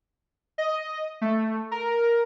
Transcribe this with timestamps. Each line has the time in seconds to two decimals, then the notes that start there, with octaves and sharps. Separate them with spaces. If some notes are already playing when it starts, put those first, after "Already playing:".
0.58 D#5
1.21 A3
1.71 A#4